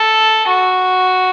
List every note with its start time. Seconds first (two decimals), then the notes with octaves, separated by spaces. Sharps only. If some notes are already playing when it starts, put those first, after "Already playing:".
Already playing: A4
0.47 F#4